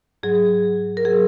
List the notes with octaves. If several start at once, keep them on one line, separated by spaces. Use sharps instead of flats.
G#2 F#3 G#4
A#4
F#3 G#4